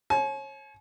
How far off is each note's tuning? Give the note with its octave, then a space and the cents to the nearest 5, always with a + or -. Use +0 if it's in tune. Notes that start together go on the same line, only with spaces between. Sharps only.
C#5 -30 G#5 +45